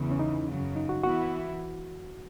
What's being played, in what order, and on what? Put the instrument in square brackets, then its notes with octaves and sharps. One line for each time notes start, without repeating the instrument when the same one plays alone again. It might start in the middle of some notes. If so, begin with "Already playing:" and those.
Already playing: [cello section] E2 C#3 E3
[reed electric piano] C#4
D#4
[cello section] F#2 C#3 F#3
[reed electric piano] D#4
F#4
[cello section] E3 B3 E4 [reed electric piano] F#4